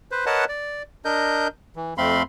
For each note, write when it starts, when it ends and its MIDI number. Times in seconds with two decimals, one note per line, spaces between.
0.11 0.25 71
0.11 0.25 72
0.26 0.45 70
0.26 0.45 71
0.26 0.45 73
0.26 0.45 75
0.26 0.45 78
0.26 0.45 81
0.49 0.83 74
1.05 1.48 62
1.05 1.48 70
1.05 1.48 75
1.05 1.48 91
1.76 1.94 52
1.98 2.23 41
1.98 2.23 57
1.98 2.23 60
1.98 2.23 77
1.98 2.23 83
1.98 2.23 84